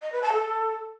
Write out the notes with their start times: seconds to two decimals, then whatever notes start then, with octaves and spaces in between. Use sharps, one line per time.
0.02 D#5
0.12 B4
0.22 A5
0.32 A4